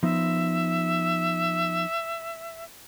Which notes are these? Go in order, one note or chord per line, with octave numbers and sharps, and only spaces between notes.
F3 B3 D#4 E5